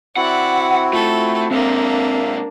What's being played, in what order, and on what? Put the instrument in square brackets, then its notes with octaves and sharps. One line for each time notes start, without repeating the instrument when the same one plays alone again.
[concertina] C4 E4 F#4 [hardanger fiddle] D5 E5 [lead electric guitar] F#5
[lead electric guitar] A3 [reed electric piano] F4 [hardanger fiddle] A4
[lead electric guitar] C3 G#3 [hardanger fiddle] A#3 D4 [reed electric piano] C4 [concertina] E5 F5